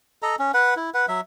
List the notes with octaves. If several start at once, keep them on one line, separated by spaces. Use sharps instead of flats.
A4 D#5 A#5
C#4
B4 F#5
E4
B4 F#5
F#3 E5